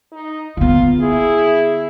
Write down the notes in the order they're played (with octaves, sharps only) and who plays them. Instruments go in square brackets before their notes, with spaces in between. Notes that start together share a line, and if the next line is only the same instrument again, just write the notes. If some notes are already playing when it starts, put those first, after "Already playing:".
[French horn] D#4
[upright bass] D3 B3 [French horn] F4
[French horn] E4 [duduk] G#4